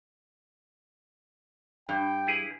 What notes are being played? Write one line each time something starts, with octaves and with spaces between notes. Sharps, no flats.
G2 G5
E4 G#4 B4